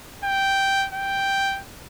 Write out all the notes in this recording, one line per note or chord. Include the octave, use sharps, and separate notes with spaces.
G5
G5